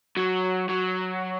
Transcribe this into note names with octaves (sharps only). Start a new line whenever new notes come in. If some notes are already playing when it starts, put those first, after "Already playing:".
F#3
F#3